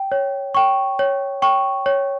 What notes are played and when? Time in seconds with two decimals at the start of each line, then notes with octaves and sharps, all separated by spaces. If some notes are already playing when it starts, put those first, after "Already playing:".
Already playing: G5
0.12 C#5
0.55 G5 C#6
0.99 C#5
1.42 G5 C#6
1.86 C#5